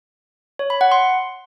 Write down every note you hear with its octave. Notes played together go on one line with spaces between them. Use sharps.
C#5
B5
F#5
C6